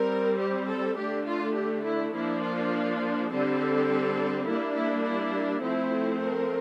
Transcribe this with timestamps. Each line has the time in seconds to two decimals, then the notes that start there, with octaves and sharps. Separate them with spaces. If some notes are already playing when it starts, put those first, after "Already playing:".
Already playing: G3 C4 A#4
0.40 G4
0.69 A4
0.97 D3 A3 D4 G4
1.27 F4
1.56 G4
1.85 E4
2.14 F3 A#3 D4 E4
2.43 F4
3.30 D3 G3 C4 A4
4.46 G3 A#3 D4 E4
4.76 E4
5.04 E4
5.63 F3 A3 C4 E4
6.21 A#4